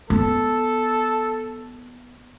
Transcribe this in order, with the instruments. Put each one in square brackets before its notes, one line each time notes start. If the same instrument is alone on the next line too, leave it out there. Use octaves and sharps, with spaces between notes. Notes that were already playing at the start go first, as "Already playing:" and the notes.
[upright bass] B3 [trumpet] A4